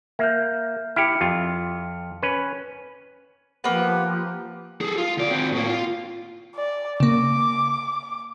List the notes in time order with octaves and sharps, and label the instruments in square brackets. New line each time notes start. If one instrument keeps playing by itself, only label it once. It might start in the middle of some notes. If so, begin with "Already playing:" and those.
[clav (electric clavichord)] A#3 [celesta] E5 F6 G6
[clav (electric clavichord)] E4 G4 [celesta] F6 C#7
[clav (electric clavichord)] F2 F4
C#4 B4
[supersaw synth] F3 G4 [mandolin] A#3 B4 [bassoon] B3
[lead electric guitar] G#4 A4
F4
D2 D5
C4 F#4
A2 A#3
F4
[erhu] D5
[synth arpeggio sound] C#3 A#3 [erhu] D6